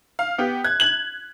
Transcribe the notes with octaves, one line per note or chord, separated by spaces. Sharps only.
F5
B3 G4
F#6 G#6
G#6 F#7